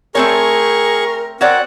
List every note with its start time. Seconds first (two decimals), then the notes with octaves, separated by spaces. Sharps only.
0.15 A3 C4 G#4 A#4 C#5 C#6
1.41 C4 F#4 A#4 C#5 D5 F#5